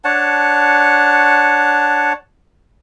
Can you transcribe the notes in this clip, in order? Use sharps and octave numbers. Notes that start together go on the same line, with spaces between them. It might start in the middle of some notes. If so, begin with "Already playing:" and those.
D4 C#5 F#5 A5